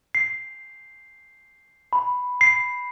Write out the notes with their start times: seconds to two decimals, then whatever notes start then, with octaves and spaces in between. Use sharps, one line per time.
0.15 C7
1.93 B5
2.41 C7